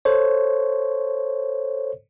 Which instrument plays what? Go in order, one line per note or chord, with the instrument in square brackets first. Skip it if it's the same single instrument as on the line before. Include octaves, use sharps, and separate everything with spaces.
[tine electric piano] A4 C5 C#5